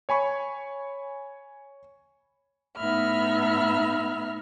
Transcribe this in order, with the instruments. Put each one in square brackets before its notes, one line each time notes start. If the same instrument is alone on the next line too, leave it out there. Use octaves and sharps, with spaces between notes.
[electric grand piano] C#5 G#5 B5 C#6
[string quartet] A2 B3 D#4 E5 B5 F6